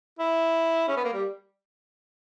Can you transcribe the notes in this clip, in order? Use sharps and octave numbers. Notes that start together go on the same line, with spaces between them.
E4
C#4
B3
A#3
G3